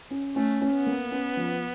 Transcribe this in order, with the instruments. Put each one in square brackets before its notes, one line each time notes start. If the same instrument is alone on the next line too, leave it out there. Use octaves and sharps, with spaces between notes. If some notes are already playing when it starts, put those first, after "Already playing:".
[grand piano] C#4
[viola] A3 [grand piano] C#4
[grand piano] C#4
[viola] B3
[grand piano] A#3
C#4
F3